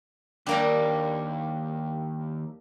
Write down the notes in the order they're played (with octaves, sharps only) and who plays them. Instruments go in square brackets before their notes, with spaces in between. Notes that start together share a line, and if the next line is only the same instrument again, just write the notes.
[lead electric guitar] D#2 [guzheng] G3 A#3 D4 [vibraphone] F5 G5